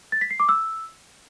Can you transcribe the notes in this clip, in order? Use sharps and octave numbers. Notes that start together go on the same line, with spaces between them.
A6
B6
C7
D6
E6